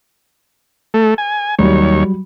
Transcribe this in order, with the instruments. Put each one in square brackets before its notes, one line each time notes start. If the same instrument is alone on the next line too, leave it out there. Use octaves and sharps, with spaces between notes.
[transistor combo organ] A3
G#5
[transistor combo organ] D#2 C#5 [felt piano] F#3 G3